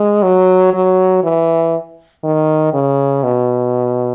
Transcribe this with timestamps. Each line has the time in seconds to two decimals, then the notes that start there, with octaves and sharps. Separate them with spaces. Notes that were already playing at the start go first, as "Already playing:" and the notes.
Already playing: G#3
0.23 F#3
0.73 F#3
1.24 E3
2.24 D#3
2.74 C#3
3.24 B2